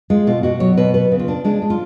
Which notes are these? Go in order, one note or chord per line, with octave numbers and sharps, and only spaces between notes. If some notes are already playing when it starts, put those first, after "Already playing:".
G#3 F4
B2 F4
B2 F#4
F#3 C#5
B2 B4
B3 B4
C#3
F4
D4
G#3 D4
G#3
F4